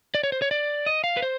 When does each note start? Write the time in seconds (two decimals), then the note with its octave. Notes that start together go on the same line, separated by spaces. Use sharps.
0.15 D5
0.24 C#5
0.32 C5
0.42 C#5
0.51 D5
0.86 D#5
1.04 F5
1.17 B4
1.22 C5